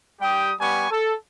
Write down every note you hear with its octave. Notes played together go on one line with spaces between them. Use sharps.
G3 G4 G5 D#6
G3 B3 G#5 C#6
A4